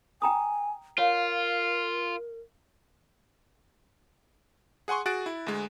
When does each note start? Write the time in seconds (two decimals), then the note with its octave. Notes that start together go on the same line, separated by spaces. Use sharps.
0.22 G5 G#5 A#5 D#6
0.98 F4 A#4 C#5 F5
4.88 G#4 F#5 G#5 C6 C#6
5.06 F#4 G#4 F#6 A6 D7
5.26 E4
5.47 D2 G#3